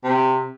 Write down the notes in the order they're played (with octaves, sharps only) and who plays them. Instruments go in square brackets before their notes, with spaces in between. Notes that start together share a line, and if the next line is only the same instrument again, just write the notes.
[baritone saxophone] C3